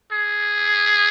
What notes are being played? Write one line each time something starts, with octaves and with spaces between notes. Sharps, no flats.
G#4